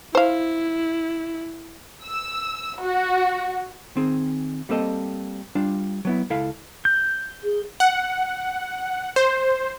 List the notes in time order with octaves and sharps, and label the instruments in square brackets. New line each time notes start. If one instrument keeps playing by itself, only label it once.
[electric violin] E4 [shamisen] C5 F5
[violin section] E6
F#4
[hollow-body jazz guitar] D#3 C4 G#4
G3 A#3 C4 A4 D#5
G3 D4 F4
F#3 B3 E4
C#2 E4 A4 F5
[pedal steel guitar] G6
[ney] G#4
[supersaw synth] F#5
C5